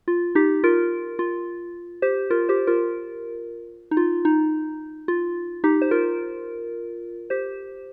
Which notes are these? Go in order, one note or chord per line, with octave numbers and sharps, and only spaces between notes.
F4
D#4 G4
F4 A#4
F4
G4 C5
F4 A#4
G4 C5
F4 A#4
D#4
F4
D#4
F4
D#4 G4
C5
F4 A#4
G4 C5